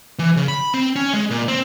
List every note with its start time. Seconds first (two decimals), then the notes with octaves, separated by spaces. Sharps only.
0.19 E3
0.36 C#3
0.48 B5
0.74 C4
0.96 C#4
1.13 G#3
1.30 A#2
1.48 C4